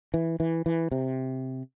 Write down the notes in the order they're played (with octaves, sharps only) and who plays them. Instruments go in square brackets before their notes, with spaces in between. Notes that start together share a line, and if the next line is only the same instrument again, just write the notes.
[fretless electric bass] E3
E3
E3
C3